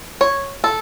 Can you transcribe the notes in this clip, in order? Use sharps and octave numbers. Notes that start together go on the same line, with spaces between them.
C#5
A4